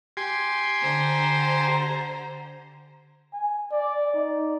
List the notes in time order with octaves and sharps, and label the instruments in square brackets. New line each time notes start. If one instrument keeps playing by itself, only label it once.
[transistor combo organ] G4 G#5 C6
[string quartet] D3 C5 A#5
[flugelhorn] G#5
D5
D#4